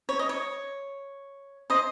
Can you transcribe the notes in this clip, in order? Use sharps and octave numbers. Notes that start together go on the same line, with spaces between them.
C#5
D#5
C#5
C5 D#5